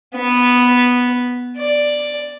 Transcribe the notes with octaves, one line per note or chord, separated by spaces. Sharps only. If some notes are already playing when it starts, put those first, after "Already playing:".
B3
D5